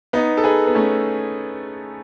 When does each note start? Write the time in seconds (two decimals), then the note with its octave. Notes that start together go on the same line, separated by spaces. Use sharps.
0.13 B3 D#4
0.37 A4
0.44 G#4 B4
0.67 B3
0.75 A3 C#4